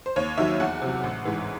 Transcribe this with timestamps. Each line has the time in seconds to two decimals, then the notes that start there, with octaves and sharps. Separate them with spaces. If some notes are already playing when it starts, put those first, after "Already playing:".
0.06 C5
0.16 D#2 C#5
0.38 D#3 F#3 E5
0.60 E2 F#5
0.82 C3 F#3
1.03 A1
1.25 G#2 E3